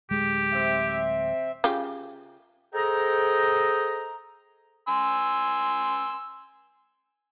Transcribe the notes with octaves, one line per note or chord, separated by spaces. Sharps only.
D1 G#3 G4
C4 E5
C#3 F4 G4
G#4 A4 C5 D#5 G5 A#5
G#5 C6 E6